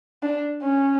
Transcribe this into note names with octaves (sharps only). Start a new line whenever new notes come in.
D4
C#4